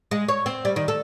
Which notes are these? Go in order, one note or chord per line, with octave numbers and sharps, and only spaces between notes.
G#3
C#5
C4
G3
D#3
A4